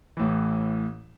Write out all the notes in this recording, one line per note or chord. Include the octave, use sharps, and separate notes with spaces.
A1 A2 E3